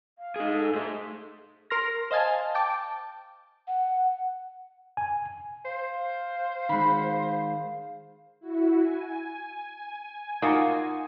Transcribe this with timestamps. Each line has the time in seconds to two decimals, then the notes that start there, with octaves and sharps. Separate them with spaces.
0.18 F5
0.36 D#4 G#4
0.52 A4
0.75 A3 G#4 C5
1.70 A#4 C6 F6 A#6
2.11 C5 D#5 F5 G#5 A5
2.55 G5 A5 D6
3.68 F#5
4.97 G#5
5.65 C5 F5
6.69 D#3 G#3 F#5 B5
8.40 E4 F#4
8.81 G#5
10.42 A#3 D#4 F4 F#4